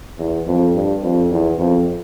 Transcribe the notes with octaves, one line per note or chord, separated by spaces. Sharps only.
E2
F2
G2
F2
E2
F2